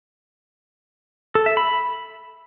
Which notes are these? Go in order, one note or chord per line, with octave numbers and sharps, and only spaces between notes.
A4
E5
B5